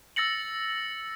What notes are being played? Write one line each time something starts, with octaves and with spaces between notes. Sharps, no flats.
E6 A6 A#6 C#7 F#7